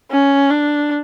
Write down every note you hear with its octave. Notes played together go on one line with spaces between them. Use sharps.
C#4
D4